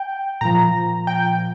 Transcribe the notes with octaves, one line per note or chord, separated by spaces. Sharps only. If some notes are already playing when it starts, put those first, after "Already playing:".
Already playing: G5
A#2 F3 A#5
G5